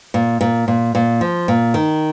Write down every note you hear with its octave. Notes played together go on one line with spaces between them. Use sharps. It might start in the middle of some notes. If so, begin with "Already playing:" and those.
A#2
A#2
A#2
A#2
F3
A#2
D#3